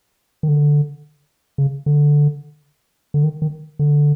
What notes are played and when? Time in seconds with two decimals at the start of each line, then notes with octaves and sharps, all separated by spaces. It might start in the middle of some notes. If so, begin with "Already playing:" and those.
0.43 D#3
0.48 D3
1.58 C#3
1.86 D3
3.14 D3
3.24 D#3
3.42 D#3
3.79 D3